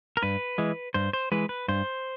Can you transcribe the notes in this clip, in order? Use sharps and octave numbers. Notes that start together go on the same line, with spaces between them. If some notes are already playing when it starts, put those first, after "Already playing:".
A#4
G2 B4
E3 G#3
G2 C5
C5
E3 G#3 B4
B4
G2 C5